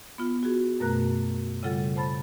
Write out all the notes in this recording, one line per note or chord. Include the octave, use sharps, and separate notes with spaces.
B3 F4
F#4 G#4
F#2 B2 A3 A#4 A#5 F#6
C#3 G3 F4 A4 F#5 A6
C5 A5 B5 A6